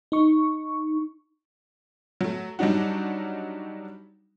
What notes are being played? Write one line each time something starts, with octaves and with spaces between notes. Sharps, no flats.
D#4 C#6
F#3 A3
F#3 G3 D4 D#4 F#4